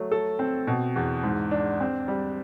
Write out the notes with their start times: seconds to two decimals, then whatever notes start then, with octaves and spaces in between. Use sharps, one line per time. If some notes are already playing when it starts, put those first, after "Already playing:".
Already playing: F#3 A3
0.12 A4
0.39 C4
0.67 B2
0.96 E2
1.23 G#2
1.51 D4
1.80 C4
2.08 G3